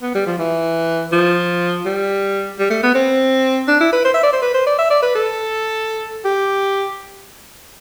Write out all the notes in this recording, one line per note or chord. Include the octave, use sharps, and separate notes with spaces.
B3
G3
F3
E3
F3
G3
G3
A3
B3
C4
D4
E4
B4
C5
E5
D5
C5
B4
C5
D5
E5
D5
B4
A4
G4